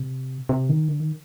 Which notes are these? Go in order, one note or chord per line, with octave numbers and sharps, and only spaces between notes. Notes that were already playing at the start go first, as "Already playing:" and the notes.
Already playing: C3
C3
D#3
D3
D#3